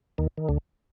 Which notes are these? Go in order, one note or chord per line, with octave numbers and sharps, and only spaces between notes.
D#2 D#3
D#3
D2 D3